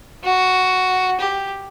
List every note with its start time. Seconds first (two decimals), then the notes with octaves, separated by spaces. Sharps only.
0.24 F#4
1.20 G4